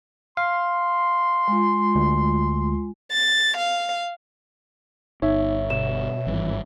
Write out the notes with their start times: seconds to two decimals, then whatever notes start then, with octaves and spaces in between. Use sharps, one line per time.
0.37 F5 C6
1.48 G#3 F4
1.95 D2
3.11 A6
3.57 F5
5.22 G1 D#4 C#5 E5
5.70 B2 E7
6.27 G#1 G2 E3